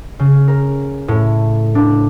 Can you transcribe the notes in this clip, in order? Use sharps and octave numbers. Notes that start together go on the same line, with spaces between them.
C#3
A#4
A2
D4